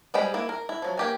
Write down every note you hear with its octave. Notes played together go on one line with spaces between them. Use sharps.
G3 G#3 C5 G5 B5
A#3 E4
A#4
E4
F3 F#3
A#3 G4 G#5